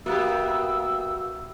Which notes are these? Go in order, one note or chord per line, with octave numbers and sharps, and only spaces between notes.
A#3 B3 F#4 G4 E5 D#6 E6